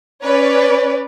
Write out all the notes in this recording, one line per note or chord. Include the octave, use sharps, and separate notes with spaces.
C#4 B4 C#5 D5